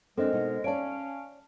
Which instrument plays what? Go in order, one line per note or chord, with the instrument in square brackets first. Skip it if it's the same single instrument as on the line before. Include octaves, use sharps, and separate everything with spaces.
[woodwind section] G#3 A#4 [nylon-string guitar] C4 D4 [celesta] A4 C5 D#5
[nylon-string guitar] B2 D#4
[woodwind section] C#4 F5 [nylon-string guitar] C#5 D5 [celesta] A5 D7